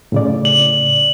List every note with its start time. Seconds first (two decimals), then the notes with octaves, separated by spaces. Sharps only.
0.12 A2 C#3 D5
0.45 F#7